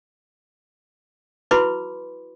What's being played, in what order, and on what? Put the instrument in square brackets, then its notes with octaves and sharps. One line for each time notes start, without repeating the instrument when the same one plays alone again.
[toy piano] E4 F#4 B4 B5 C6 D6